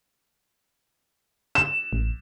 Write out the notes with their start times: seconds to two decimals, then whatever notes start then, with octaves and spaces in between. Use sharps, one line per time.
1.55 E7
1.93 A1